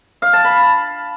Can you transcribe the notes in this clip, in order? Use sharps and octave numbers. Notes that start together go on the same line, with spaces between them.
F5
A5
B5